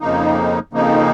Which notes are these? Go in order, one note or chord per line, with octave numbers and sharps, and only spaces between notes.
F2 C#3 F3 A#3 D#4
F2 C#3 F3 A#3 D#4